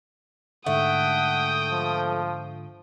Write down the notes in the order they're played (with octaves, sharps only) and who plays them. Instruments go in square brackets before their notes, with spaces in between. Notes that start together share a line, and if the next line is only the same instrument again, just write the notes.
[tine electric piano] G#2 D3 [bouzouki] A3 [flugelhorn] F#5 [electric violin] G5 D#6
[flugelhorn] F3